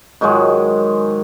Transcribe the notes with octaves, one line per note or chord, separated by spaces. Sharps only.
G#2 D#3 F#3 G#3